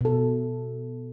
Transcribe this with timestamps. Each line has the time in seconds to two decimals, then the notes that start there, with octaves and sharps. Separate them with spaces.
0.01 B2 A4